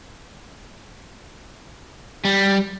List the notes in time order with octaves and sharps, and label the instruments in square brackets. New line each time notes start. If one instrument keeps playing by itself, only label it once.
[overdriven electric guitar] G3